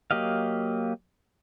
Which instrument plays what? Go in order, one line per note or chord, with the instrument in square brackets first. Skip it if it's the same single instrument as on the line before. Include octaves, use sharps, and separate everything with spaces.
[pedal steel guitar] F#3 A#3 G4 D#5 F5